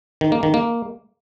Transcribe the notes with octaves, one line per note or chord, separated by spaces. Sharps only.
D#3
A#3
D#3
A#3